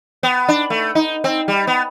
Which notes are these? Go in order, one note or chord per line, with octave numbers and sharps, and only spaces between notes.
B3
D4
A3
D#4
C4
G3
B3